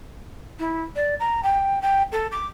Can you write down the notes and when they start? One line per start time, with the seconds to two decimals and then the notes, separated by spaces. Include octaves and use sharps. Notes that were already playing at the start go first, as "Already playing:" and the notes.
0.59 E4
0.96 D5
1.20 A#5
1.43 G5
1.82 G5
2.12 A4
2.32 D6